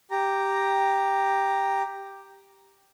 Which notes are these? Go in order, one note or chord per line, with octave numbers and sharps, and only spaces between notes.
G4 A#5